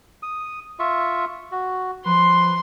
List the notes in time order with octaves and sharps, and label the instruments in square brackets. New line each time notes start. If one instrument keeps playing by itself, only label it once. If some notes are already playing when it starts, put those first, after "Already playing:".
[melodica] D#6
F4 E5 C#6
F#4
[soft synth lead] F3 [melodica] B4 [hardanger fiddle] C6